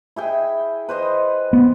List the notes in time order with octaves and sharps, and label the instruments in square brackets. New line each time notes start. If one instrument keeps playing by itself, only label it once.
[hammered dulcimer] E4 G#4 G5
B4 C5 D#5
[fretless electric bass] B3